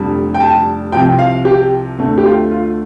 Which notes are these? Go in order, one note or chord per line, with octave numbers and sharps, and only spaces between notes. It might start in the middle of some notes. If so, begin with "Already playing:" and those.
Already playing: F1 F2 D3 G3
G5
A5
C2 C3 F3 C4 G5
F5
G4
D2 D3 A3 C4
G4
F4
F4